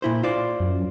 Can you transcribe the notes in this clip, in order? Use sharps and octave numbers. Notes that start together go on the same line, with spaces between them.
A#2 E4 C5
F4 C5 D5
F#2